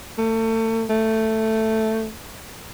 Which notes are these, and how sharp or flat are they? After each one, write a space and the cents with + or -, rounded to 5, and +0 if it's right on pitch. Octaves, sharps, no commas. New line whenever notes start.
A3 +35
A3 +5